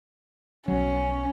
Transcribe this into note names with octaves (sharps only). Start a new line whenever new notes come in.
B1 F#3 C#4